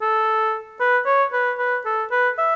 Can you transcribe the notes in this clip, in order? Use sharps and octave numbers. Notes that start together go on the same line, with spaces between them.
A4
B4
C#5
B4
B4
A4
B4
E5